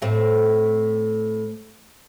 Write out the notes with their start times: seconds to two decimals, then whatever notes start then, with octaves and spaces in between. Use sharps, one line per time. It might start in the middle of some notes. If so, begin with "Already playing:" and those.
0.02 A2 A3 C4